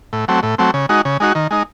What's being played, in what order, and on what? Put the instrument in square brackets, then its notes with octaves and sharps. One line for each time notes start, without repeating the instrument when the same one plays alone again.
[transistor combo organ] A2
F#3 A3 C4
A2
F#3 A3 C4
C#3
G#3 D#4 F#4
C#3
G#3 D#4 F#4
D#3
G#3 D#4